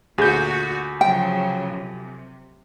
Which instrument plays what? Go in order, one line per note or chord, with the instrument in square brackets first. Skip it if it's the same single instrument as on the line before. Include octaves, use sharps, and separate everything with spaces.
[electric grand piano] D2 G6 [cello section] A#2 F#4 [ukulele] G#4
[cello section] C#3 F3 F#3 [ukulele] G5
[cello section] C3